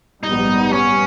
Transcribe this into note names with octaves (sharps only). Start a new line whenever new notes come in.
A#1 G#2 G3 B3 D#4
C#4